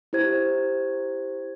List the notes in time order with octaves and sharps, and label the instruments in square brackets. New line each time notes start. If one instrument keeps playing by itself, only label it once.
[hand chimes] E4 G4 C5 G#6